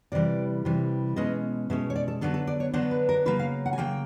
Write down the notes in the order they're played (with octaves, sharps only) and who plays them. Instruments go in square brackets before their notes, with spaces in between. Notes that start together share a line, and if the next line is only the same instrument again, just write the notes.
[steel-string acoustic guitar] C3 E3 G3 D5
C3 E3 G3
B2 G#3 C#4 D#5
B2 G#3 C#4 E5
C#5
D5
A4
D3 F#3 B3 D4 A4
A4
D5
C#5
D3 F#3 B3 D4 C5
B4
A#4
C#3 F#3 A#3 B4
F5
F#5
G#5
C#3 F#3 A#3 G5